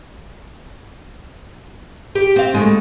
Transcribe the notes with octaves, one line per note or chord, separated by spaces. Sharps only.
G4
C4 F5
A2 D3 G#3